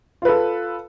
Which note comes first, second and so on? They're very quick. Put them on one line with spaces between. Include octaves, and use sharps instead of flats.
F4 B4 A4